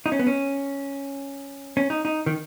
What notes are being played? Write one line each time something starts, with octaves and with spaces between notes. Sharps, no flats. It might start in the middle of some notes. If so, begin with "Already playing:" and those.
D#4
C#4
B3
C#4
C#4
D#4
D#4
D#3